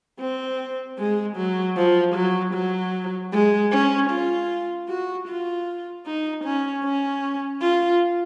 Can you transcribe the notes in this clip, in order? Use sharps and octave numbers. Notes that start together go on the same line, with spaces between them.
C4
G#3
F#3
F3
F#3
F#3
G#3
C#4
F4
F#4
F4
D#4
C#4
C#4
F4